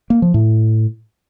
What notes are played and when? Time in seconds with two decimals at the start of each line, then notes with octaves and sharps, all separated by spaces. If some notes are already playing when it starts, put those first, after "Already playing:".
0.10 A#3
0.22 F3
0.34 A2